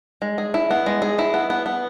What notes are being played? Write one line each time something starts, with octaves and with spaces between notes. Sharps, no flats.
G#3
G#4
E4
B3
G#3
G#4
E4
B3
B3
B3